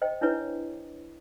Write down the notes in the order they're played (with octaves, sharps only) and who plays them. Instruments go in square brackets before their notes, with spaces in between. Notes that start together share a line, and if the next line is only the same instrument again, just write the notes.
[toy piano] C5 D#5 G5
D4 E4 B4 C#5